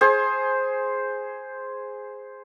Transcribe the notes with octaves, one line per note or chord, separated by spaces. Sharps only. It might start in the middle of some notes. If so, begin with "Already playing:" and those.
G#4 C5